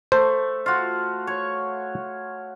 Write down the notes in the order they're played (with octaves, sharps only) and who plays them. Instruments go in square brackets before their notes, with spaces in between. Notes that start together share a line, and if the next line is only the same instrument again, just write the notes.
[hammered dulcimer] A3 [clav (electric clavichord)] C5
[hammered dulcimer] F4 F#4
C#5